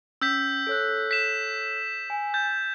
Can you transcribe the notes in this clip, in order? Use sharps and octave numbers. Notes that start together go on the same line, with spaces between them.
C#4 E6 G6 B6
A4 C#5 F#6
B6 E7
G#5
G6 A6